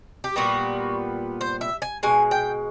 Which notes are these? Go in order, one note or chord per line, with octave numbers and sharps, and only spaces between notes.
G4
A#2 G3 B3 F#4
C5
E5
G#5
B2 G#3 G#5
G5